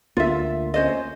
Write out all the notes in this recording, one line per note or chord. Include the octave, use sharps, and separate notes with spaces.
D2 A#3 F4 E5
C#4 C5 D#5